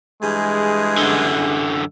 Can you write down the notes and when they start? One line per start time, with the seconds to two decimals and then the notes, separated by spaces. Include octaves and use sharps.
0.22 G2 E3 G#3 G#4
0.98 F#2 D3